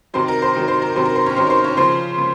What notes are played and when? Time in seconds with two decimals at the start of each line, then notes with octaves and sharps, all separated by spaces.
0.14 C3 D#3 F#3 C5
0.28 A#4
0.42 C5
0.55 C3 D#3 F#3 A#4
0.68 C5
0.82 A#4
0.96 C3 D#3 F#3 C5
1.05 A#4
1.16 C5
1.26 C#4 C#5
1.36 C3 D#3 F#3 C5
1.47 A#4
1.50 C5
1.64 C#4 C#5
1.77 C#3 F3 C5
2.18 C#3